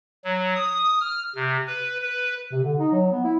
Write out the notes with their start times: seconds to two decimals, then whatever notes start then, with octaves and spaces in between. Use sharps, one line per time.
0.24 F#3
0.55 D#6
1.00 F6
1.36 C3
1.67 B4
2.02 B4
2.51 C3
2.63 D3
2.78 D#4
2.92 F#3
3.12 B3
3.24 E4